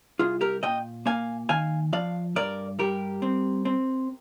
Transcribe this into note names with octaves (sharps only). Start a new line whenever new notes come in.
C2 F4 G#4
G4 A#4
A#2 D#5 G5
A#3 F5 G#5
D#3 F5 G#5
F3 D5 F5
G2 A#4 D5
G3 G4 A#4
C4
C4